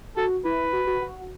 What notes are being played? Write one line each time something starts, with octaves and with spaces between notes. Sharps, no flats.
F#4 A4
E4 B4
F#4
F#4
F#4